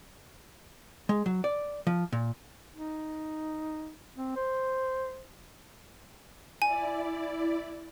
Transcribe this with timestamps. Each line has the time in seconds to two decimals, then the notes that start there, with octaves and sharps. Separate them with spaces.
1.09 G#3
1.26 F#3
1.44 D5
1.87 F3
2.13 A#2
2.76 D#4
4.16 C4
4.36 C5
6.62 E4 D5 G#5